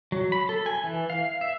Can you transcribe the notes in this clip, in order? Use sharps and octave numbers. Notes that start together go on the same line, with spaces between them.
F#3
B5
A4
G#5
E3
F5
E5